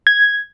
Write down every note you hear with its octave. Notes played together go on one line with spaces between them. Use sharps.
G#6